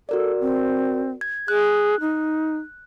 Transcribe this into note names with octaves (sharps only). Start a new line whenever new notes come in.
F#4 A4 A#4 D5
C4
G#6
G#4 F#6
D#4